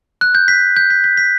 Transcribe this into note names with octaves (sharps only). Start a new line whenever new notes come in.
F#6
G6
B6
G6
B6
B6
B6